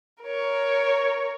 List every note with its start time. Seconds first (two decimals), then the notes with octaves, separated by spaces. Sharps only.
0.23 A#4 C#5